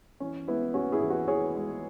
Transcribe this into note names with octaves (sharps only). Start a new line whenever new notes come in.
E3 C#4
G#3 B3 E4
E2 C#4 F#4
E4 G#4
E2
F#4 B4
E3 G#4 C#5
G#3